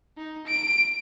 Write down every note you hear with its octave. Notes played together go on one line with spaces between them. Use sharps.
D#4
D7